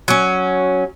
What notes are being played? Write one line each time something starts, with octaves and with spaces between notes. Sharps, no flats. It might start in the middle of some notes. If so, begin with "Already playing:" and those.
F#3 C#4